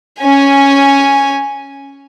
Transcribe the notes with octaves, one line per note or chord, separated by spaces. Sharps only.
C#4 G#5